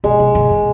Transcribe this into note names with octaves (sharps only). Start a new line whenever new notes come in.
C3 G#3
C3
C#3
C#3